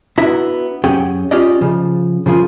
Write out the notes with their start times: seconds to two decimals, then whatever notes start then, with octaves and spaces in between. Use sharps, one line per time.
0.18 B3 D4 E4 F#4 E5 A#5
0.84 F#2 C#4 G4 G#4 F#5 G5
1.31 C#4 F4 G4 G#4 D5 D#5
1.61 C#3 F3
2.26 C#3 F3 F4 G#4 A#4